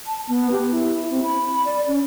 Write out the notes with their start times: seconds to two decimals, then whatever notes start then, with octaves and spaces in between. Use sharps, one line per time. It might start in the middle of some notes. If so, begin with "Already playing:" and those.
0.06 A5
0.29 B3
0.52 G4
0.71 E4
1.11 C4
1.23 B5
1.65 D5
1.87 C#4